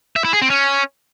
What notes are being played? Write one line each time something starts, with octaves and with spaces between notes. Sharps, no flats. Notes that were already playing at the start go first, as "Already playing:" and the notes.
E5
E4
G#4
C4
C#4